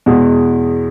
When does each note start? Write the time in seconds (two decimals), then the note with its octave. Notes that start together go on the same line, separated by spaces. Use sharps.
0.06 E2 B2 G#3